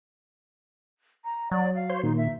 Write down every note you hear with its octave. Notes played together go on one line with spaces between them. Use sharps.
A#5
F#3 D5
F5
C5 C#5 C6
A#2 D#3 D#4
E5